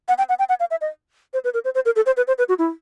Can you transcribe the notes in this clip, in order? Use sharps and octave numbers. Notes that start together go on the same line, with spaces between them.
F#5
G5
F#5
G5
F#5
F5
E5
D#5
C5
B4
A#4
C5
C5
A#4
A4
C5
B4
C5
B4
F#4
E4